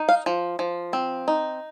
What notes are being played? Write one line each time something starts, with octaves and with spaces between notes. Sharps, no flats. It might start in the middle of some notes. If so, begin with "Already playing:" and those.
Already playing: D#4
F5
F3
F3
C4
D#4